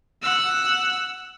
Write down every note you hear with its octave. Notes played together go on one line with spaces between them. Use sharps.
F#5 E6